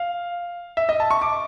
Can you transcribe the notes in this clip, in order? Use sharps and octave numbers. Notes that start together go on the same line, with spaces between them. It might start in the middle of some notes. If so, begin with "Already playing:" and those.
Already playing: F5
E5
D#5
A5
C#6
D6